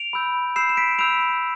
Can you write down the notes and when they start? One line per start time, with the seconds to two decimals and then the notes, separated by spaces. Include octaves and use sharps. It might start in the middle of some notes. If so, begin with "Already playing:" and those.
Already playing: D7 F7
0.13 B5 E6 G6
0.56 B5 E6 G6 C7 E7
0.69 E7
0.77 B6 D7
0.99 B5 E6 G6 D7 F7